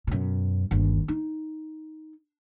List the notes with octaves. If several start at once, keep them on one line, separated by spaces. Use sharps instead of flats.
F#2 B2
G1 D#2
D#4